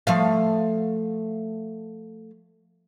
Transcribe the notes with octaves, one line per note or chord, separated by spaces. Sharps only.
F3 A3 F5